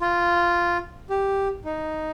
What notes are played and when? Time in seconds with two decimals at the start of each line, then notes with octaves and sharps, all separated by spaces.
0.01 F4
1.10 G4
1.65 D#4